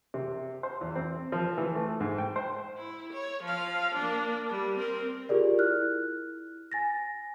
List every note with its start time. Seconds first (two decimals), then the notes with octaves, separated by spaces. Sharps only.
0.14 C3
0.63 C5
0.81 E2
0.96 C4
1.32 F3
1.58 E3
1.75 A3
2.00 G#2
2.18 G5
2.36 C5
2.78 E4
3.13 C#5
3.43 F3 F5
3.96 A#3 D4
4.49 G3
4.78 C4 A#4
5.29 F4 G4 G#4 A#4 D5
5.59 E4 F6 F#6
6.72 G#5 A6 A#6